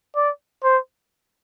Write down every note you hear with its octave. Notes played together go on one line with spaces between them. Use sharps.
D5
C5